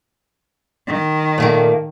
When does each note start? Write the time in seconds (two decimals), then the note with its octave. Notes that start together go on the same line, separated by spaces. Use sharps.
0.87 D#3
1.38 A#2 A3 A#3